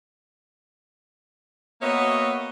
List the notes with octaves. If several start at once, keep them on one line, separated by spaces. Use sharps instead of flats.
A#3 B3 F#4 C#5 D#5 E5